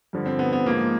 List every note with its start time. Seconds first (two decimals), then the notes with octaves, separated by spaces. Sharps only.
0.13 G2 D3 F3
0.26 C4
0.39 B3
0.53 B3
0.66 G#2 F3 A#3